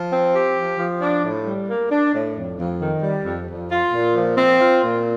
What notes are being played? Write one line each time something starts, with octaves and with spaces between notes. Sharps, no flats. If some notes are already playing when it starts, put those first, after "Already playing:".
Already playing: F3
C4
G4
F3
F3
D4
A2
G3
A#3
D4
A2
F2
F2
D#3
G3
F2
F2
F4
A#2
F3
C4
F4
A#2